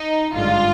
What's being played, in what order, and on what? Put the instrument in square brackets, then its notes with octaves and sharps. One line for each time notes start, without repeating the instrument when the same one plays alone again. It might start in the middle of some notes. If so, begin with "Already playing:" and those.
Already playing: [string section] D#4
G#1 G2 D3 G#3 F4